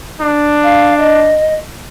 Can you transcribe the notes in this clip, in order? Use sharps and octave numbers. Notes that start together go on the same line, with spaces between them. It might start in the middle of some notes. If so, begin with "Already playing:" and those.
D4
F5
D#5